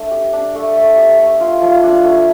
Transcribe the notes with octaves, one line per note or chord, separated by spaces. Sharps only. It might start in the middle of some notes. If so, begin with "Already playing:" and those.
Already playing: A3 D4
G4
D4
A3
A3
G4
A3
F4
F3
D4
A3